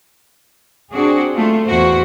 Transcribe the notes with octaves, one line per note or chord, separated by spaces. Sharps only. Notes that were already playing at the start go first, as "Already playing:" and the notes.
C4 D4 F#4 G#4
A3 F4
E2 E4 F#4 C5